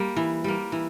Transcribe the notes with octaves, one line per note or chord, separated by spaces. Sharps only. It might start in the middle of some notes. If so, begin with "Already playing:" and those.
Already playing: G3 A#3
E3
G3 A#3
E3